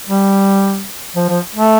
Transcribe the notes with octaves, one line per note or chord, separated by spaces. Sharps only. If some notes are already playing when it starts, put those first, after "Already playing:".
G3
F3
F3
A3